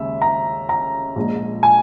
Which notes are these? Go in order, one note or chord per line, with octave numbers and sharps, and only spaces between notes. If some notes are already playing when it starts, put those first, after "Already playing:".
Already playing: D#2 C#3 G#3 E5
A#5
A#5
A#1 A#2 G#3
G#5